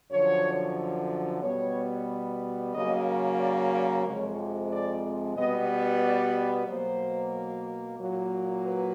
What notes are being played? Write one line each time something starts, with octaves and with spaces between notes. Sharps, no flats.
F#2 D3 F3 C#5
B2 G3 B3 C#5
C#3 F#3 A#3 D#5
D5
D5
F2 C3 F3 G#3 C4 C#5
D5
B2 G3 B3 D#5
D5
B2 F#3 A#3 C5
A#2 F#3 A#3
B4